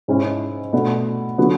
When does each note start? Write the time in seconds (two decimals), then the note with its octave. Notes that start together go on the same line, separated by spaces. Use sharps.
0.08 G#2 G#3 C#4 E4
0.73 B2 A3 D4
1.38 D3 F#3 B3 F#4